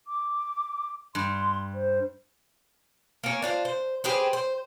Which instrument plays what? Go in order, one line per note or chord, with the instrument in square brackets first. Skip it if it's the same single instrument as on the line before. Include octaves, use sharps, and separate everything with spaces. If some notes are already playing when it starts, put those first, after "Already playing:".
[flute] D6
[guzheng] G2 [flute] C6
[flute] C5
[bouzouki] A#3 C#4
D4 F4 C5
C5
G4 G#4 B4 C5
C5